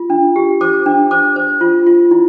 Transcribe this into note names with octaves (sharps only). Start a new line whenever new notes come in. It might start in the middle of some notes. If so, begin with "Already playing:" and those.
Already playing: F4
D4
G4
C5 D6
D4
C5 D6
C5
F4
F4
E4